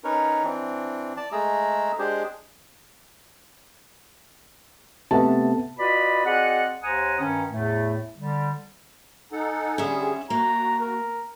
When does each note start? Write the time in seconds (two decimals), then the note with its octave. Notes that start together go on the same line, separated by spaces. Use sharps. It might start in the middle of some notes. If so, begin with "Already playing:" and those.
0.04 C#4 D#4 A#4 B4 C#5
0.43 E3 C4 D4
1.17 D5 A5
1.32 G#3 A3 G#4 A#5 E6
1.99 G#3 D4 G4 G#4 C5
5.11 C3 A3 B3 A5
5.78 F4 F#4 B4 D5 D#5 B5
6.25 C4 F#4 G#4 D5 D#5 F#5
6.83 D#2 C5 F#5 G#5 A#5 D#6
7.20 G2 D#3 C#4
7.51 E2 A2 A3
8.18 D3 G3
9.32 D#4 A4 F#5 G#5
9.78 D3 G3 C#4 G#4 E5
10.30 A#3 F#4 A#5
10.80 A#4